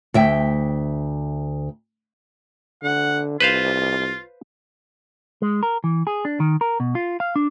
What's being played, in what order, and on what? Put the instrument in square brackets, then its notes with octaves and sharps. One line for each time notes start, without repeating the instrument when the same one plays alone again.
[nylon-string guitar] D2 E5 G5
[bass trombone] D3 [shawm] F#5
[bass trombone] C2 [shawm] F4 [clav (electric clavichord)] B4 C5 F5
[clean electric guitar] G#3
A#4
E3
G#4
D4
D#3
A#4
B2
F4
F5
D4